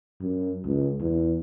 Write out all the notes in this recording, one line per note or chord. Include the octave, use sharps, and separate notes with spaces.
F#2
C#2
E2